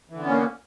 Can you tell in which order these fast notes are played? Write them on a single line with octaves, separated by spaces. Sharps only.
E3 D3 B3 C#4 A#3